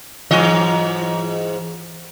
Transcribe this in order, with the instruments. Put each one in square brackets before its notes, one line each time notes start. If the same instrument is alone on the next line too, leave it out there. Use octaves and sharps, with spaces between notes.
[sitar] G#2 E3 D#5